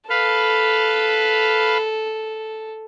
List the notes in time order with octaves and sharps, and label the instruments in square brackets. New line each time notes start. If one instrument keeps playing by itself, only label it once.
[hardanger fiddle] A4 [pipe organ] B4 F5